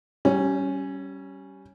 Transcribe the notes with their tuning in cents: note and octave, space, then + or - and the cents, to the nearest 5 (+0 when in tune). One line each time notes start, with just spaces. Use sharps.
G3 -25 C#4 +0